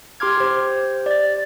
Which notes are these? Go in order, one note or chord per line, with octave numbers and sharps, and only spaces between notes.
G4 C6 D6 F6 G#6
G4 C5
D5 A6